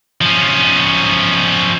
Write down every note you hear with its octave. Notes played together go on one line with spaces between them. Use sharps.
F3 C#4